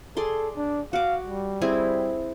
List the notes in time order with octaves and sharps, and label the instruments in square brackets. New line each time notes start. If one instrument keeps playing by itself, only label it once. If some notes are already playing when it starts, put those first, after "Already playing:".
[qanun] G#4 D5 C6 [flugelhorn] A4
[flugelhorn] D4
[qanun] F#4 D6 [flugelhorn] F5
[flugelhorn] G3
[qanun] C4 E4 G#4